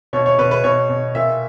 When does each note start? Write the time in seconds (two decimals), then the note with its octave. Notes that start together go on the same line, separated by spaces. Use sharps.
0.13 B2 C#5
0.26 C#5
0.38 B2 B4
0.51 B4
0.64 B2 C#5
0.89 B2
1.15 A#2 E5